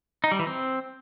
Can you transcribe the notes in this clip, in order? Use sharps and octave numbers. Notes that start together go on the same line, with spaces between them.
D#4
G3
E3
C4